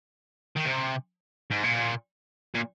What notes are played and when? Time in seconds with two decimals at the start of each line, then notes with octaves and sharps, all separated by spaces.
0.56 D#3
0.66 C3
1.51 G#2
1.64 A#2
2.54 A#2